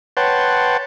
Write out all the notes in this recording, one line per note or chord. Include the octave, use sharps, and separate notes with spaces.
B4 C#5 F#5 G5 A5 C6